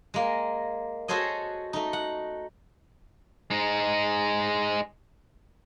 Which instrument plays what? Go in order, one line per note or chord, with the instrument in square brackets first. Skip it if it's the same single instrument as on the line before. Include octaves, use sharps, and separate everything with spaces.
[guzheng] G#3 A#3
F#4 G#4 A4 C5 C#5 D#5
A3 D#4
F#5
[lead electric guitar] G#3 D#4